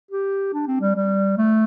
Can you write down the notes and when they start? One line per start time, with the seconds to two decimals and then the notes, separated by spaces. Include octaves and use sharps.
0.11 G4
0.53 D4
0.67 C4
0.81 G3
0.95 G3
1.37 A3